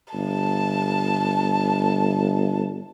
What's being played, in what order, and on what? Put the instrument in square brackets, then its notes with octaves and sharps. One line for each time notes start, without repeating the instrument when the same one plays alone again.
[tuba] G1 [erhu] A5